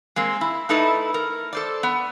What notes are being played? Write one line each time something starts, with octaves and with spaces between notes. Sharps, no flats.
G#3 A#3 C4
E4
A3 D#4 E4 A4 B4
A#4
A4 C5 D5
B3